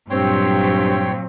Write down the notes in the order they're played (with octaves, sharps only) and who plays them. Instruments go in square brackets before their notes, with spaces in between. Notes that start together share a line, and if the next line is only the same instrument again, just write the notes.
[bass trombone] G2 [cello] A#2 F#3 [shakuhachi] C4 [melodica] C#5 G5 C6